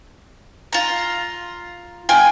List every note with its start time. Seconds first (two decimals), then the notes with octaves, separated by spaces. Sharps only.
0.73 F4 A#5
2.09 F4 G5 G#5